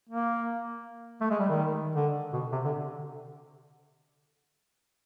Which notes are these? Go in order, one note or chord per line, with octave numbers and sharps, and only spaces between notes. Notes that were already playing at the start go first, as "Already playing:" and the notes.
A#3
A3
G#3
G3
D#3
D3
B2
C3
D3